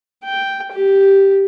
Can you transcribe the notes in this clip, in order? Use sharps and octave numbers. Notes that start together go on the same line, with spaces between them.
G5
G4